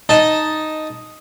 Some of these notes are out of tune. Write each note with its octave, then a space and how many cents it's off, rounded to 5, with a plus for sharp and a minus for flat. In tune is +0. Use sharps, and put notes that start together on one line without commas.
D#4 +0 D#5 +0 A5 +0